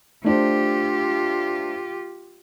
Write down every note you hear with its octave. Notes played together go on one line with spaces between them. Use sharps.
A3 D4 F4 G4 C5